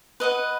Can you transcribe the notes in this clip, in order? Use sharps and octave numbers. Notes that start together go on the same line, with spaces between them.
B4 D#5 F#5